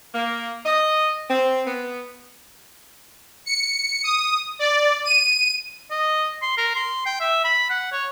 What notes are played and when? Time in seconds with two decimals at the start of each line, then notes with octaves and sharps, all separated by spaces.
0.14 A#3
0.65 D#5
1.29 C4
1.66 B3
3.46 C#7
4.04 D#6
4.59 D5
5.05 D#7
5.91 D#5
6.42 C6
6.57 A#4
6.76 C6
7.06 G5
7.20 E5
7.44 B5
7.70 F#5
7.92 C#5